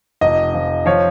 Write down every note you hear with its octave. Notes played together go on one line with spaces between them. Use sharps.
F1 D#5
F3
F3 C#5